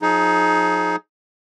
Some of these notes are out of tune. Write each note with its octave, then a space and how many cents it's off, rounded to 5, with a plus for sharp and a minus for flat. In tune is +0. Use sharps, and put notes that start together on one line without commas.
F3 +30 D#4 +10 G#4 +25